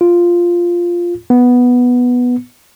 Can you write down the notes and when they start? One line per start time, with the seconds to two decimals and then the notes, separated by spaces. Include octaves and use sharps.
0.01 F4
1.30 B3